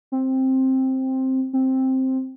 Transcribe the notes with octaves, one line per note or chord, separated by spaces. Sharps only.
C4
C4